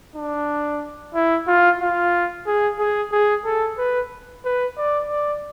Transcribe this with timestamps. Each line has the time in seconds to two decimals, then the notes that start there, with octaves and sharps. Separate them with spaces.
0.16 D4
1.15 E4
1.47 F4
1.81 F4
2.47 G#4
2.79 G#4
3.12 G#4
3.45 A4
3.78 B4
4.45 B4
4.77 D5
5.10 D5